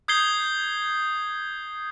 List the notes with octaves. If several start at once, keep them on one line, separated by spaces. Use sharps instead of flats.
D#6 G6 G#6 C7 G7